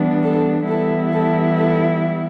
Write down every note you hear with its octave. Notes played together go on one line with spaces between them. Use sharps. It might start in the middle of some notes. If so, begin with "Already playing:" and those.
Already playing: E3 G3 B3 D4
A4
E3 G3 B3 E4 A4
A4
A4